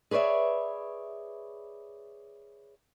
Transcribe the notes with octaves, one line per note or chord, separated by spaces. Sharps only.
G#4 B4 C#5 D5 E5